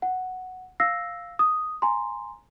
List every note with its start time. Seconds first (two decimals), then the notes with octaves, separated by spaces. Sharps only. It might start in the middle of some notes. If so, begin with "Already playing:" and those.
0.02 F#5
0.80 F5 E6 A#6 C7
1.39 D#6
1.82 G#5 A#5 C6